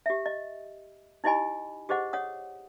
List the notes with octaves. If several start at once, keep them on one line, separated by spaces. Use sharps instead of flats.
G4 E5
D#5
D#4 E4 G4 D#5 G#5 B5
G4 G#4 C5 D#5 F#5
C#5 F#5 D#6